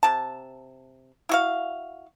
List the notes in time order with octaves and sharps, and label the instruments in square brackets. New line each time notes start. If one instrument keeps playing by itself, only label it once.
[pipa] C3 A5
E4 F#4 F5